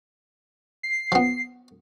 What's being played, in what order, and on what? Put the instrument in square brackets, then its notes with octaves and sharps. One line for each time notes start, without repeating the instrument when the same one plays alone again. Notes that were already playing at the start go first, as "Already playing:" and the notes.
[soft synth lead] C7
[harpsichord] F3 B3